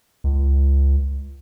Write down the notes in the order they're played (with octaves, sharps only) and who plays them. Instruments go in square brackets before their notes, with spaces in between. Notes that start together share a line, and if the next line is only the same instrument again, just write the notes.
[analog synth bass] C#2